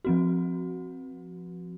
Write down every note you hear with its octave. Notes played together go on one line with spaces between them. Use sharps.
F3 C4 F#4